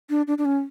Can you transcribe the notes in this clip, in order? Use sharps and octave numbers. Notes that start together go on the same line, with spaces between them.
D4
D4
D4
C#4